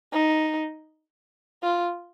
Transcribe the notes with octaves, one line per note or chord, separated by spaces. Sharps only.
D#4
F4